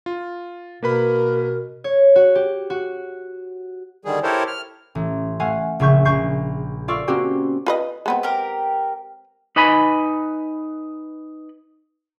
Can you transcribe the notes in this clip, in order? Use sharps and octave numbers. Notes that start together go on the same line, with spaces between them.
F4
B2 A#3 A#4 B4 B5
C#5
F#4
G4
F#4
D3 D#3 G3 G#4
E4 G4 A4 A#4 C5 C#5
F6
A1
A3 F5 F#5 G#5
A#1 C#3 E5 C#6 G6
A#1 C#6 G6 C7
F4 A4 D5 F5 C#6 E6
A#3 C4 C#4 F#4 G4 C5
F4 B4 D#5
G#3 B3 C4
G4 A#4
D#4 B4 G#5 B5